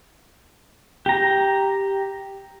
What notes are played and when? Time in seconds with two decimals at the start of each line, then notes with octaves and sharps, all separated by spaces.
1.06 G4 A#5